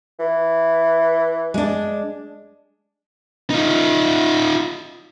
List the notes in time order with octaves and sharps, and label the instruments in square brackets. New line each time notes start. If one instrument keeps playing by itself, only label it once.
[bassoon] E3
[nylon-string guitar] G#3 D4
[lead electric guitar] D#4 F4